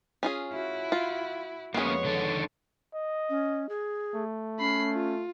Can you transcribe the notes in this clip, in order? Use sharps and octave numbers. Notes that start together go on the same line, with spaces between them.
C#4 F4 G#4
E4 F#4
F4
F2 G#3 A#3 B3 C#4 G#4 C#5 C#6
D3 D#3 A4
D#5
C#4
G#4
A3
C#4 B5 C7
F4